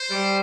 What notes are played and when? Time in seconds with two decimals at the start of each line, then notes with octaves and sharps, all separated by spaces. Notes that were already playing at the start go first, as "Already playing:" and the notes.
Already playing: C5
0.10 G3